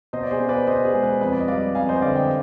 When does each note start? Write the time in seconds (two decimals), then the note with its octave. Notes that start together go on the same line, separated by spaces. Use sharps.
0.13 B2 C5 D#5
0.23 D5
0.31 G#4 C5
0.40 B3
0.49 B4 D5
0.67 B2 C5 D#5
0.85 G#4
0.94 G#3
1.03 B4
1.21 F2 B4
1.32 D5
1.40 D#5
1.48 G3 D5 F5
1.75 F2 F5 G#5
1.89 C5 D#5
2.02 D3 D5 F5
2.16 D#5 G5